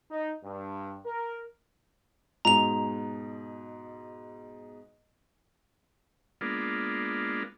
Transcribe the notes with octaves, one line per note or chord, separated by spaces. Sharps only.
D#4
G2
A#4
G#2 B2 A#5 F7
G#3 A#3 B3 D4 F4